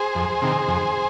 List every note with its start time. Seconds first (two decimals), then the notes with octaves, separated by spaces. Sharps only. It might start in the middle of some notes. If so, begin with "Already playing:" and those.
Already playing: G#4 C5
0.15 F2
0.42 C3 D#3
0.68 F2